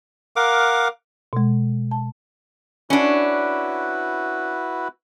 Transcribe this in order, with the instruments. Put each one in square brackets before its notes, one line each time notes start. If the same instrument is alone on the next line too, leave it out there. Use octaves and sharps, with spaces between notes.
[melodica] A#4 F5 F#5 D6
[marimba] B2 G#3
A5
[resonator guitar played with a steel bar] C#4 D4 [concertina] E4 F#4 B4